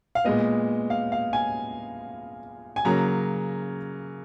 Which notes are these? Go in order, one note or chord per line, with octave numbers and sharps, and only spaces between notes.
F5
A#2 G#3 B3 D#5
F5
F5
G#5
G#5
C#3 F#3 A#3 A#5